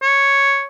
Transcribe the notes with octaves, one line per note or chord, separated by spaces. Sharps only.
C#5